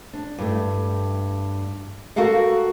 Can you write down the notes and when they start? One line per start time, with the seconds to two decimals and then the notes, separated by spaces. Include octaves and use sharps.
0.13 D4
0.38 G2 A3
2.16 F#4 A4 A#4 F5 F#5